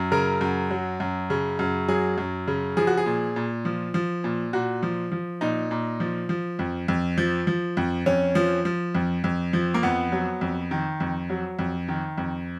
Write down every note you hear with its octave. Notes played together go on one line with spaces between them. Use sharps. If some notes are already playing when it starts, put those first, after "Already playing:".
Already playing: F#2
C#3 A#4
F#2
F#3
F#2
C#3
F#2
F#3 G#4
F#2
C#3
F3 G#4
F#4
G#4
A#2
A#2
F3
F3
A#2
A#2 F#4
F3
F3
A#2 D#4
A#2
F3
F3
F2
F2
F3
F3
F2
F2 C#4
F3
F3
F2
F2
F3
A#3
F2 B3
F#3
F2
D#3
F2
F#3
F2
D#3
F2